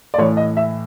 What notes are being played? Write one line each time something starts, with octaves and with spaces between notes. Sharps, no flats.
D5
A2 E3 C#5
D#5
E5